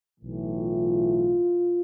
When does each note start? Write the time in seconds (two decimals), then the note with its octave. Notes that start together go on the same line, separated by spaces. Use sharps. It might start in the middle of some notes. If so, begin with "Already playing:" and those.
0.18 B1 A2 E3
0.56 F4